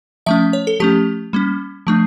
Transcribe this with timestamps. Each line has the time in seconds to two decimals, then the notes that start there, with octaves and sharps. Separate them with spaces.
0.26 F3 A3 C#4 E5
0.53 C#5
0.67 A4
0.80 F3 A3 C#4 G4
1.33 G3 A#3 C#4
1.87 F3 A3 D4